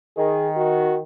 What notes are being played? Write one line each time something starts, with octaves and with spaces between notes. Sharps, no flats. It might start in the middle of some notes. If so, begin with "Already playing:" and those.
D#3 G#4
F#4